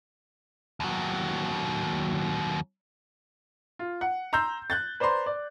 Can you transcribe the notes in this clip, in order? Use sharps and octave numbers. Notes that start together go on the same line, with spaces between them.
D#2 F#3
F4
F#5
A#5 C6 E6 G6
F#6 G6 A6
B4 C5 D5 A#5 C6
D5